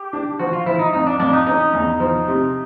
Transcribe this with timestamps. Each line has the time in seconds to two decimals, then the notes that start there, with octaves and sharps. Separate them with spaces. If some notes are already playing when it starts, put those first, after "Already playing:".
Already playing: G4
0.13 D4
0.39 F3 F#4
0.53 F4
0.66 F3 E4
0.79 D#4
0.93 F2 D#4
1.07 D4
1.20 F2 D4
1.33 D#4
1.47 C#4 D#4
1.73 E2
2.00 F3
2.28 C3